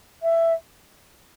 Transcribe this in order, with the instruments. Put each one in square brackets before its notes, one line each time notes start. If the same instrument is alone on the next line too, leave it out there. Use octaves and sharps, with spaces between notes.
[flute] E5